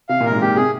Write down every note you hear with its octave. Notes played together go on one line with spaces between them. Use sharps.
C3 F5
A#2 A#4
G#2
A#2 G4
C3 G#4